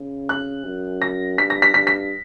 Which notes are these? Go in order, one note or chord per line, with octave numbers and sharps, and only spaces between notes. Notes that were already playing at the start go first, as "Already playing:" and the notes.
Already playing: C#3
F#6
F#2
A#6
G2 B6
A#6
B6
G2 B6
B6